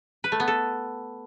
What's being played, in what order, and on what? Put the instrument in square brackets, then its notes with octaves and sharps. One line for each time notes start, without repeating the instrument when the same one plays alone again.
[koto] B4
A3
B3
A4